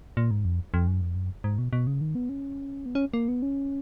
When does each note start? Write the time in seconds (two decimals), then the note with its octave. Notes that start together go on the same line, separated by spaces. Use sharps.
0.17 A#2
0.31 G#2
0.45 F2
0.74 F2
0.88 F#2
1.01 F2
1.15 F#2
1.44 G#2
1.58 B2
1.73 B2
1.87 C#3
2.01 D#3
2.15 B3
2.29 C#4
2.86 B3
2.95 C#4
3.14 A#3
3.28 B3
3.42 C#4